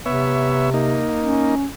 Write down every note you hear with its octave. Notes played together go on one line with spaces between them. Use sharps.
C3 B3 C#5 E5
A#3 D#4
C#4